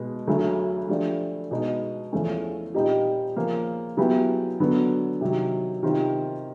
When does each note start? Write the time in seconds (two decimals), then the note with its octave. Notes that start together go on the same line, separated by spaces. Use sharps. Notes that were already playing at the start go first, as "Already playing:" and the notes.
Already playing: B2 G#3 B3
0.27 D2 C#3 F#3 A3
0.89 F3 A3 D4 G4
1.51 B2 G#3 B3 D#4
2.12 E2 C#3 F3 A3 C#4
2.75 A#2 G3 C4 D#4 G4
3.36 C#3 F3 A#3
3.97 C#3 F#3 B3 E4 G4
4.60 D3 F#3 B3
5.21 C3 D#3 F#3
5.83 C3 D#3 G3 C4 F4